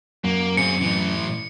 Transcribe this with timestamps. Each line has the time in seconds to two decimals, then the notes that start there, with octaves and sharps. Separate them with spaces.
0.24 F#2 A#3
0.57 C4 G#4 C#7
0.81 A2 E3